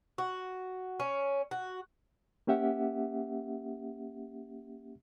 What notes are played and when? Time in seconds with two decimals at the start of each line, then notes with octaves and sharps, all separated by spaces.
0.18 F#4
1.00 C#4
1.51 F#4
2.47 A#3 C#4 G4 E5 F#5